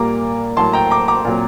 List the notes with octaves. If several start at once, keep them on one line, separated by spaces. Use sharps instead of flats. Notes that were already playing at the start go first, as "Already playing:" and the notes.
Already playing: A#2 G3 A#3 A#5 D6
A2 F#3 A#3 A5 C6
G5 A#5
A#5 D6
A#5 D6
A#2 F#3 C4